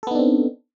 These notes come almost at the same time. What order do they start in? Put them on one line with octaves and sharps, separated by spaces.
A4 B3 D#4 D4 C4